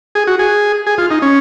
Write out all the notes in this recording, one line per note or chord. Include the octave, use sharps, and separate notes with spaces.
G#4
F#4
G#4
G#4
F4
D#4
C#4